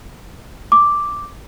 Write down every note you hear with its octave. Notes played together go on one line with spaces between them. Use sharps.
D6